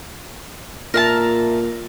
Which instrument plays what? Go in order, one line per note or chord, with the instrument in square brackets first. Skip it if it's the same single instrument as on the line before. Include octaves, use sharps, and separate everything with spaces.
[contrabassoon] A#2 [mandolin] A#4 E5 A5